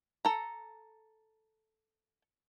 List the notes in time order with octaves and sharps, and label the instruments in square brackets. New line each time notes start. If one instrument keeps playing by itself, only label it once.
[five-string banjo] A4 A#5